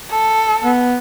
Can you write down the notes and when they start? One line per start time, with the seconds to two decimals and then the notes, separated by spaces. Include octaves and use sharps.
0.10 A4
0.63 B3